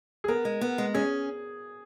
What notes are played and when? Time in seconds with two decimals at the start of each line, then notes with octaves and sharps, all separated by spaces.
0.24 G#4
0.28 B3 A#4
0.45 G#3
0.61 B3
0.78 G#3
0.94 C#4 G#4